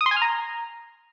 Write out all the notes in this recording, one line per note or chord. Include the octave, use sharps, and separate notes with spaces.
D#6
C6
G#5
F6
A#5